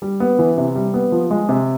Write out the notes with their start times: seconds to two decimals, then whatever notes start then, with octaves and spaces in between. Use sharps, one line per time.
0.02 G3
0.20 B3
0.39 E3
0.58 C3
0.76 G3
0.94 B3
1.12 F3
1.31 G#3
1.49 C3